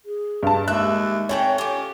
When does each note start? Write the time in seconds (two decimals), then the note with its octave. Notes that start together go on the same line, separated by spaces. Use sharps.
0.05 G#4
0.43 G2 A5
0.68 D#2 G#3 E5 F#6
1.29 A3 C4 C#5 G5 G#5
1.58 C#4 F4 G4 A4